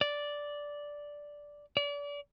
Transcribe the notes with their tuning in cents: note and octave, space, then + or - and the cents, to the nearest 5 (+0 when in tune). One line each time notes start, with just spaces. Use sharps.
D5 -5
D5 -35